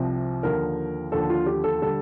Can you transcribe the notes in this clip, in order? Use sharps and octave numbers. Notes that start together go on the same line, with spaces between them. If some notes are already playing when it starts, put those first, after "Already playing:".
Already playing: C2 C3 F3
D#2 D3 F3 A#4
D#2 D3 F3 A4
F4
G4
A4
D3 G3 A4